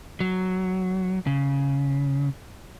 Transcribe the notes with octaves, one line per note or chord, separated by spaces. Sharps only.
F#3
C#3